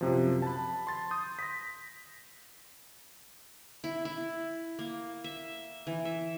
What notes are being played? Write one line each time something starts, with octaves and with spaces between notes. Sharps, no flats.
F#2 C3 F3
A5 B5
C6 A6
C6 D#6 G6
A#6 B6
E4
E4
A#3
E5
E3
E5